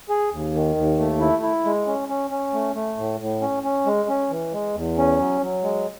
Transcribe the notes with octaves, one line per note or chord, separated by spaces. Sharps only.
G#4
D#2
D#3
D#2
A3
E4
E4
G#3
C#4
C#4
C#4
A3
A3
A2
A2
C#4
C#4
G#3
C#4
E3
G#3
E2
C#4
F#3
F#3
G#3